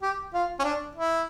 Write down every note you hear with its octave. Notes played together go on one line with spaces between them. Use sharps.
G4
F4
C#4
D4
E4